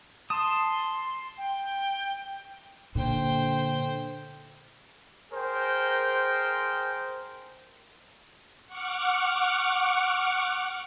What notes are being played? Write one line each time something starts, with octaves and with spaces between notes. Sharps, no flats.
A5 C6 D#6
G5
A#2 D3 C5 G5
G#4 A#4 C5 G5
F#5 C#6 D6 F6